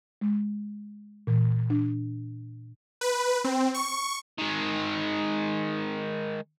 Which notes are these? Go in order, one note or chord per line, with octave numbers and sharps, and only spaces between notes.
G#3
A#2 E3
D4
B4
C4
C#6
D#3 G#3